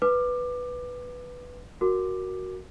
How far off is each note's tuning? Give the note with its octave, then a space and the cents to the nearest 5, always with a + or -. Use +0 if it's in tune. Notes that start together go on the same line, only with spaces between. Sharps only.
B4 +0 D6 +20
F#4 +0 A#4 +0 D6 +10